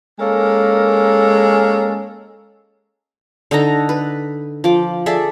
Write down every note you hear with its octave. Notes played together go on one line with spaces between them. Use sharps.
G#3 A#3 C#4 A4 A#4
D3 D#4 A4 A#5
B4
F3 D6
G#4 A4 D5 E5